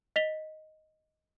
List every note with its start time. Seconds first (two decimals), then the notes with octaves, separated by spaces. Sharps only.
0.16 D#5 B6 F7 G7